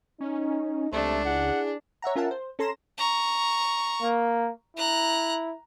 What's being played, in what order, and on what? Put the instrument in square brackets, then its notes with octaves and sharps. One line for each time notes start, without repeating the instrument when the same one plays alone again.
[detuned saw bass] C#4 [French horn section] D#4
[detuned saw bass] C#2 [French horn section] C3 G3 [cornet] A3 [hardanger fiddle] D4
[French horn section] E4 G#4 [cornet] F#5
[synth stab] C#5 E5 F#5 A#5
C#4 F4 A#4 E5 F#5 A5
C5
C#4 A4 A#5 C6 A#6 E7
[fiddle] A#5 C#6
[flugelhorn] A#3
[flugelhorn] E4 [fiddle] A#5 F#6